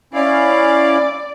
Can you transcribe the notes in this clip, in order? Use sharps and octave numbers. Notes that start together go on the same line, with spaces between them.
C#4 E4 D5 F5